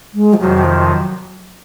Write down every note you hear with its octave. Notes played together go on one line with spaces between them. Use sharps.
G#3
F3
F2 C3 D#3 F#3
F3
F#3